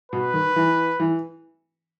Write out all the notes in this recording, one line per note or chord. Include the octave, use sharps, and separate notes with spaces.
B2 B4
D#3
E3
E3